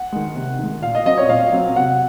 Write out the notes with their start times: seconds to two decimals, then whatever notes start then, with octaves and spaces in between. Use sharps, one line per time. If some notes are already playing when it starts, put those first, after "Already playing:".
Already playing: F#5
0.12 D#3 G#3
0.35 C3
0.59 D#3 G#3
0.82 A#2 F5
0.95 D#5
1.05 F#3 C4 D#5
1.18 C#5
1.29 A#2 F5
1.53 F#3 C4
1.76 C3 F#5